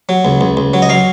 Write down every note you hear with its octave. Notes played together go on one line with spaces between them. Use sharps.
F#3
C#2
C#2
C#2
F#3
D#5
F#3 F5